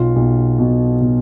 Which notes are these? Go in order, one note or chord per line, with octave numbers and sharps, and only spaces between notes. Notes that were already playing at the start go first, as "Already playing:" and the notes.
Already playing: B1 F4
B1
B2
B2